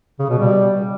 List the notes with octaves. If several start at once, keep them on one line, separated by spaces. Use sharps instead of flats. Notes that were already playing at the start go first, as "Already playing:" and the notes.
C#3
B2
G3